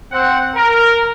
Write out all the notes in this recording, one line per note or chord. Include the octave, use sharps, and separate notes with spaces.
C4 F#5
A#4